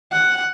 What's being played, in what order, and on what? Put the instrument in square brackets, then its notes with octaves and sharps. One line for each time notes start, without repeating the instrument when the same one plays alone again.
[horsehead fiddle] F#5